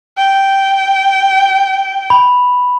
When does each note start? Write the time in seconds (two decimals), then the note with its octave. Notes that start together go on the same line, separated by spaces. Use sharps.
0.18 G5
2.10 B5